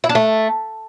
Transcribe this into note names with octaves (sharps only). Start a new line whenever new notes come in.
E4
D4
A3